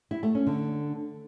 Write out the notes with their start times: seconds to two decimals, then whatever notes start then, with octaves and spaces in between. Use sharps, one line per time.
0.11 E4
0.23 A3
0.35 C#4
0.47 D3